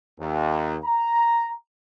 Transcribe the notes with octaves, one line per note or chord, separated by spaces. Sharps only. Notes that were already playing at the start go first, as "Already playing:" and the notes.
D#2
A#5